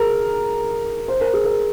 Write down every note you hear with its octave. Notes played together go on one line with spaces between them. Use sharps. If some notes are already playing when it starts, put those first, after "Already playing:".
Already playing: G#4 A#4
C5
A#4
G#4
A#4